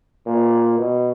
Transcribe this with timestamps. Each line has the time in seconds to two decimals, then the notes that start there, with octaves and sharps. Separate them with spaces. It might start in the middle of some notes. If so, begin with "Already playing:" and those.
0.26 A#2
0.78 B2